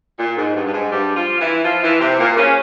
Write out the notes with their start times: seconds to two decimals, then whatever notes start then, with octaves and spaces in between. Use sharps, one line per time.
0.19 A#2
0.37 G#2
0.55 G2
0.67 G2
0.73 G#2
0.92 G2 G3
1.16 F3 F4
1.40 E3 E4
1.65 F3 F4
1.83 E3 E4
2.01 C3 C4
2.19 A#2 A#3
2.37 C#3 C#4